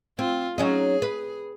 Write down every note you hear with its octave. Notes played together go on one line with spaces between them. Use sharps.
C4 F4
F#3 C#4 D#4 G#4
B4